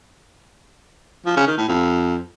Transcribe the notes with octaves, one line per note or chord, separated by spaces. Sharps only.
F3
C#3
D#3
A2
F2